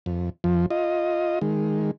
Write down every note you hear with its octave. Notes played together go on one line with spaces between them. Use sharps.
F2
F2 F3
F4 D#5
D#3 G#3